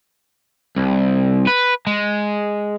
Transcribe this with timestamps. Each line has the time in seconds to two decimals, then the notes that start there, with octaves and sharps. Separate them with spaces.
0.76 C2
1.47 B4
1.87 G#3